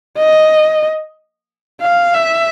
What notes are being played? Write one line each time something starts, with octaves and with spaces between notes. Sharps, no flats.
D#5
F5
E5